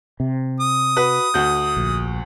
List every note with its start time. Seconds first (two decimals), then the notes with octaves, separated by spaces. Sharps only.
0.20 C3
0.60 D#6
0.96 F#4 B4
1.34 D2 F#4 G6
1.77 A#1